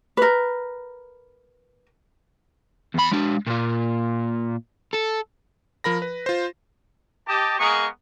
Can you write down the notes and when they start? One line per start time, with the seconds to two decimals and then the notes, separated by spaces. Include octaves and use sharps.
0.17 A#4 B4
2.95 E2 B5
3.12 G#3 D4
3.47 A#2 F4
4.94 A4
5.84 F3 A#4 B5 A#6
6.02 B4
6.26 F4 C5
7.28 G4 D#5 A5
7.59 G#3 A#3 B3 G#4 A#4 C#6